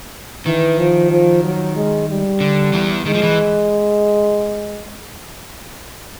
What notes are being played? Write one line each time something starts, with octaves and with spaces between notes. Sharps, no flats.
D#3 E3
F3
F3
F#3
G#3
G3
D3
E2 E3
D#3 G#3
F3
E3